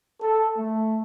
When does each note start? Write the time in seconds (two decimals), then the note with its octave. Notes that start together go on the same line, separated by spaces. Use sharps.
0.21 A4
0.57 A3